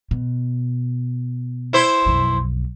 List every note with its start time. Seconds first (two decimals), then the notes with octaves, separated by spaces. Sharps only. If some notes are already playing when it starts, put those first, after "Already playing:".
0.11 B2
1.73 E4 C5
2.06 B1 F2